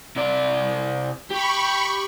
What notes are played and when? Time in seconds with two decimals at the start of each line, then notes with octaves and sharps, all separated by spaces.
0.16 C3 D5
1.30 G4 B5 C#6